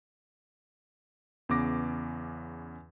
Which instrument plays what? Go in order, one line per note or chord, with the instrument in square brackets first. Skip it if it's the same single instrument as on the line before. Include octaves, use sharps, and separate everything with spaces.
[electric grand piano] E2 C#3 B3 D6 A#6